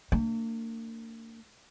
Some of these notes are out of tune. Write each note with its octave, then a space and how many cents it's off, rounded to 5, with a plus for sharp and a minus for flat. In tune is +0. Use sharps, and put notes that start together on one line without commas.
A#3 -45 D4 +0